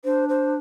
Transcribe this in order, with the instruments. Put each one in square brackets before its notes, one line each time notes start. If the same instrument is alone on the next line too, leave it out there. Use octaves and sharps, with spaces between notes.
[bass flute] D4 [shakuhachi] C5
[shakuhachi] C5